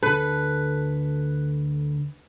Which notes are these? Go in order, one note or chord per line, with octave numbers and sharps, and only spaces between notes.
D2 D3 A4 B4